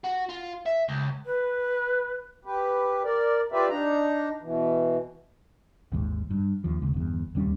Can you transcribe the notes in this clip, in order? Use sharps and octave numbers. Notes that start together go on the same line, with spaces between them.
F#4
F4
E5
C#2
B4
G4 B4
A#4 D5
F4 G4 B4 D5 E5
D4 D#4 A#5
B2 E3
G#1 D#2 G#2
G2
D#2 F3
D#1 C#2
G1 E2
D1 D#2 G3 C#4